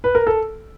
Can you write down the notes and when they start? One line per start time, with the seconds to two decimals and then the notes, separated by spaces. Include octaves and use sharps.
0.04 B4
0.15 A#4
0.27 A4